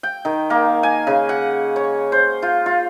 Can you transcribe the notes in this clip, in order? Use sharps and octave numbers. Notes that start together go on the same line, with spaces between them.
G5
D#3
A#3
G#5
C#3
F#5
C#5
C5
F4
F4